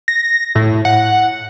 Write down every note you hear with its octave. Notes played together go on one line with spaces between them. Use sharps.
A#6
A2
F#5